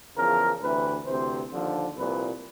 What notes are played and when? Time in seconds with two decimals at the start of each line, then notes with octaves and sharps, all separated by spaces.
0.17 E2 C#3 F3 A#4
0.62 D2 C3 E3 B4
1.06 D2 C3 E3 C5
1.52 D#2 D3 F3
1.97 C2 A#2 F3 B4